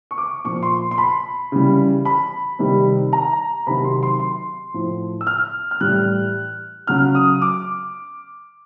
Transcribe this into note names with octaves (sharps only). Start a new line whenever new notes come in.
C#6
D6
A#2 F3 C#6
C6
C6
B5
C#3 E3 G3
B5
C3 D#3 G3
A#5
C3 D#3 F#3 B5
C6
C6
C6
A2 F3
E6
F6
F6
A2 E3 G3 F#6
C#3 F#3 F6
D#6
D6